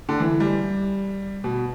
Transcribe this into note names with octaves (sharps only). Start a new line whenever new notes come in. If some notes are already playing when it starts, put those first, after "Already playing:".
D3
E3
G3
B2